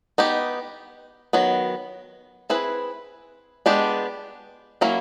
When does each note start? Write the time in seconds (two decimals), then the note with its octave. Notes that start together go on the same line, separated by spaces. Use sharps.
0.18 B3 D#4 G4
1.33 D#3 F#3 B3
2.50 C4 E4 G#4 B4
3.66 G#3 B3 D4 G4
4.81 F#3 A#3 C#4 E4